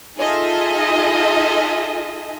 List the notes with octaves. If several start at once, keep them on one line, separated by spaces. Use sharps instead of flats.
D#4 F4 G#4 A4 D#5 E5